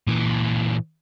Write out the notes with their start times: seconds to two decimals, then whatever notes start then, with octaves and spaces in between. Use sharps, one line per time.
0.07 A#2 E3